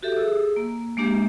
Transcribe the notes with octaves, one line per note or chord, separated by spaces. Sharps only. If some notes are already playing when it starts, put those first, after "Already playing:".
F#4 G4 A4 E5
G#4 E6
A#3
G#3 A#3 D4 G4